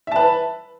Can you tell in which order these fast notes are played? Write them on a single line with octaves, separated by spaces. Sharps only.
E5 A5 B4